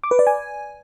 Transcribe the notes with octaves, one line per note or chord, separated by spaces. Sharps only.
D6
B4
D5
G#5